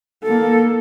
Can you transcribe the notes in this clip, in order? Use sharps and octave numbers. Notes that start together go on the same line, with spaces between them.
A#3 A4